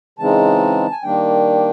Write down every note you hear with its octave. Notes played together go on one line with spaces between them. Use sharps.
C#3 E3 G#3 C4 D#4 A5
G#5
D#3 G3 A#3 D4 G5